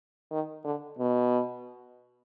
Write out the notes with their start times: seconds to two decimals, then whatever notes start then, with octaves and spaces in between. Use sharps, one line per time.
0.31 D#3
0.64 D3
0.99 B2